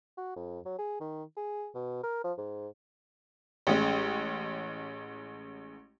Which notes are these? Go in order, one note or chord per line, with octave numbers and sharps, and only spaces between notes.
F#4
F2
F#3
G#4
D#3
G#4
B2
A#4
F3
G#2
A1 G#3 C#4